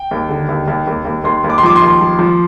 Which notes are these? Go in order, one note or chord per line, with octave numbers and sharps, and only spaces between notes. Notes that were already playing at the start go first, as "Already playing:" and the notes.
Already playing: G5
D#2
D3
D#2
D#2
D#2
D#2
D#2 C6
D#2
D6
C6
F3 D6
C6
D#2
F3
F3